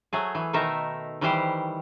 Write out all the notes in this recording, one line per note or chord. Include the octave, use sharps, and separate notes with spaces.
F#3 A3 G#4
E3
B2 D#3 A3 D#4 A#4 E5
D#3 E3 G3 G4 C5